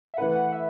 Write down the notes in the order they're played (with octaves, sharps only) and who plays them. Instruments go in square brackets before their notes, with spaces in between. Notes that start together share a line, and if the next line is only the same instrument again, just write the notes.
[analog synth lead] E5
[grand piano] E3 A3 E4 B4 [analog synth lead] F#5
[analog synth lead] F#5
E5